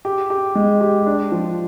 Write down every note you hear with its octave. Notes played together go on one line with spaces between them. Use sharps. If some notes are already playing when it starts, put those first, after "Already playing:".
G4
G4
G#3
G4
D4
F3